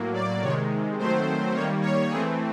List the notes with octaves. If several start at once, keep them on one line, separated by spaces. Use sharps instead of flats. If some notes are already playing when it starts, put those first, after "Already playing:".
Already playing: A2 F#3 A#3
D5
C3 D#3 G#3 C#5
D#3 F#3 A3 C4 C5
D#3 G3 A#3 C#5
C#5
E3 A3 C4 G#4